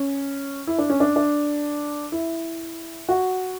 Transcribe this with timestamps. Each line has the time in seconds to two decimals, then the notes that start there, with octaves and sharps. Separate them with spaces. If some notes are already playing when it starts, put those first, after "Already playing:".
Already playing: C#4
0.67 E4
0.78 D4
0.90 C#4
1.00 D4
1.16 D4
2.12 E4
3.09 F#4